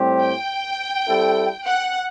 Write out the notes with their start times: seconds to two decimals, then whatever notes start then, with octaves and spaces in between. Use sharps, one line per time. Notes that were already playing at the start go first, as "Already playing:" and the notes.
Already playing: A2 G3 C4 G4 C5
0.22 G5
1.08 G3 C4 E4 A4
1.66 F#5